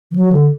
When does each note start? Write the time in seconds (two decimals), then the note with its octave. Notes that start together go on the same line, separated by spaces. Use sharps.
0.11 E3
0.16 F#3
0.32 D3